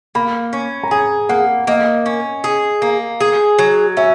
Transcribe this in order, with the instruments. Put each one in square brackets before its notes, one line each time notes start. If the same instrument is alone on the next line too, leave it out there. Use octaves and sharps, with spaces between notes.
[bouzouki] A#3 [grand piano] B5
[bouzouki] C#4
[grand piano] A#5
[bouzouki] G#4 [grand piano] G#5
[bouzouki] A#3 [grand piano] F#5
[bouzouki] A#3 [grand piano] D#5
[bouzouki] C#4
G#4
A#3
G#4
F#3
[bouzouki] C#4 [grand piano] E5